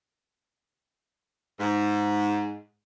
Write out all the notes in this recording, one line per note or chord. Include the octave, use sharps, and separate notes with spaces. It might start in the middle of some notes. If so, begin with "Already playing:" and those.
G#2